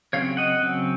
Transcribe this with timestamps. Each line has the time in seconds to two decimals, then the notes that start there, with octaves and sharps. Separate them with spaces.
0.13 C#3 F#3 C4 C#5 F5
0.37 D#5 F#5
0.62 C#3 F#3 C4